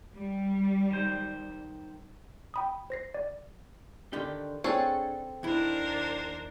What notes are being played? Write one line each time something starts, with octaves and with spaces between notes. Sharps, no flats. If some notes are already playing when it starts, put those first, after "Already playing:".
G3
D#3 C5
G5 B5 D#6
C5 A#6 C7
D5
D3 D#3 G4
C4 D4 G#4 A4 C#5
D#2 D4 E4 A#4 C5